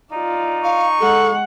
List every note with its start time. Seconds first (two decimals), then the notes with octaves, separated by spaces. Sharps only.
0.12 D#4 F4 D5
0.63 F5 C#6
1.00 G#3 A4 F#5